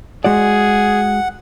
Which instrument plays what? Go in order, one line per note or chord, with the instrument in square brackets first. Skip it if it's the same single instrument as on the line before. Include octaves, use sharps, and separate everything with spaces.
[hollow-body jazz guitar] G#3 F#4 D5 [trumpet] G#4 [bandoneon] F#5